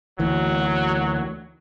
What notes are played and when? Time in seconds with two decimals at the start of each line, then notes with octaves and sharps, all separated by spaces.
0.19 D2 E3 F#3